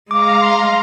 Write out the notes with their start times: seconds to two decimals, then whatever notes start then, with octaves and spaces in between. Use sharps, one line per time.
0.11 G#3 F5 A#5 D6
0.41 C6